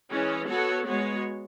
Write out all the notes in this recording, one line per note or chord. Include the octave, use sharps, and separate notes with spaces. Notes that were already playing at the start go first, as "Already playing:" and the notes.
E3 G#3 C#4
B3 F#4 A4 C#5
G#3 B3 F#4 C#5